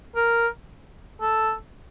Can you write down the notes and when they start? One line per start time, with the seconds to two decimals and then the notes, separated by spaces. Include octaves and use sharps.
0.16 A#4
1.21 A4